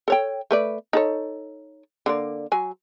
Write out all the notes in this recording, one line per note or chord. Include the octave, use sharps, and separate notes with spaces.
A4 C#5 G5
A3 B4 D5
D#4 A4 C#5
D3 A#3 D5
F#3 G#5